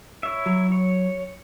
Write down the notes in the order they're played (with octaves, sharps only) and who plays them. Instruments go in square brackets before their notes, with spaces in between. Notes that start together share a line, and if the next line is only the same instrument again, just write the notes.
[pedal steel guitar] E4 C#5 E5
[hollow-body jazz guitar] F#3
[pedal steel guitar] C#5